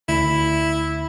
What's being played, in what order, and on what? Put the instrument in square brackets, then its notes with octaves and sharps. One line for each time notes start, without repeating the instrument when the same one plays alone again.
[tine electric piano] D2 [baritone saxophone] E4